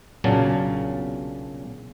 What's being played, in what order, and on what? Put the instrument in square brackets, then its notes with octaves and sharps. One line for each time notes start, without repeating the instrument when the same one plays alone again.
[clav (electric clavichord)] B1 A#2 C#3 F#3 D4 A5